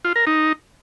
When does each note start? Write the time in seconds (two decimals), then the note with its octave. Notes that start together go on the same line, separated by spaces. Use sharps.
0.05 F4
0.16 A#4
0.27 D#4